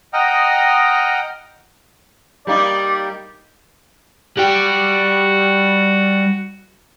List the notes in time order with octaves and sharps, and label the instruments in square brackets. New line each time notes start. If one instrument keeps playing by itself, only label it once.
[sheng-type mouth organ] D#5 F#5 G5 A#5 D#6 F6
[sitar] G3 A#3 D#4 [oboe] D5
[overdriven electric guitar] G3 G4 [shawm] F#4